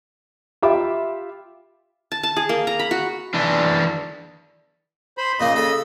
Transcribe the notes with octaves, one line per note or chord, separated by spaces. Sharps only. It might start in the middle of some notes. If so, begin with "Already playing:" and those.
F4 G4 E5 B5 D6
A5
A5
G#4
A#3
A#5
B5
F#4
E3 D4
C5 B5
A#2 C#3 A#3 D#4 D#5
A4 B5